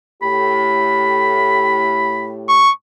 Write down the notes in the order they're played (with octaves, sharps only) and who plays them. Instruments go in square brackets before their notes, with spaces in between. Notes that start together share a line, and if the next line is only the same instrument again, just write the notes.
[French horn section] A2 G4 [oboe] B5
[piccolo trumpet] C#6